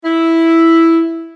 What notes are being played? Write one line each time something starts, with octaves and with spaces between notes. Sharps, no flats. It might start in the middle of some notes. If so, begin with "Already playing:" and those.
E4